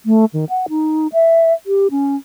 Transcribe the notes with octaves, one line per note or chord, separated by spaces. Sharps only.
A3
D#3
F#5
D#4
E5
G4
C#4